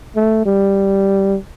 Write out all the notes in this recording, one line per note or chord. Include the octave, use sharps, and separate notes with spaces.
A3
G3